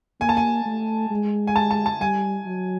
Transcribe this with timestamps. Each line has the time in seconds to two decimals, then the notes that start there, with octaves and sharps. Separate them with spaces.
0.21 A#3 G#5
0.29 A5
0.37 G#5
0.65 A3
1.10 G#3
1.47 G#5
1.56 A5
1.71 A5
1.86 A5
2.00 G3 G#5
2.46 F#3